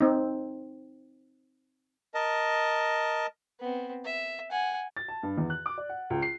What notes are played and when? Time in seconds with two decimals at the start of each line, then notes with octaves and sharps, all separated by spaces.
0.01 C4 D#4
2.14 A#4 D#5 A5
3.60 B3 C4
4.04 E5
4.51 F#5 G#5
4.97 A6
5.08 A5
5.23 G2
5.38 E2
5.50 F#6
5.66 D6
5.78 D5
5.89 F#5
6.10 C#2
6.22 C7